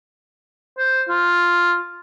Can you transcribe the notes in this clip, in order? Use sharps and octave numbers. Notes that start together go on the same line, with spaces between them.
C5
F4